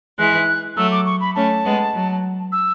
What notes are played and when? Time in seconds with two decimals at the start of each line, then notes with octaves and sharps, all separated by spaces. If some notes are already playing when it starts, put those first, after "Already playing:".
0.19 E3 G#3 F#6
0.76 F#3 A3 E6
0.91 D6
1.06 C#6
1.21 B5
1.35 A3 C#4 A5
1.64 G#3 B3
1.94 F#3
2.52 E6